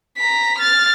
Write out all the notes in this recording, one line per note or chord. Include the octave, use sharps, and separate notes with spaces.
A#5 B6
F6 A6